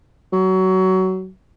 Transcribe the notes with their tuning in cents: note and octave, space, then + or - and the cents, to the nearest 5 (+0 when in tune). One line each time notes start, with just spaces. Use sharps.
F#3 +20